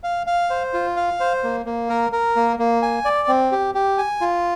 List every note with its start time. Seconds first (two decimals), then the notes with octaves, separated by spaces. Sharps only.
0.04 F5
0.27 F5
0.50 C5
0.73 F4
0.97 F5
1.20 C5
1.43 A#3
1.66 A#3
1.89 A#4
2.12 A#4
2.36 A#3
2.59 A#3
2.82 G#5
3.05 D5
3.28 C4
3.52 G4
3.75 G4
3.98 G#5
4.21 F4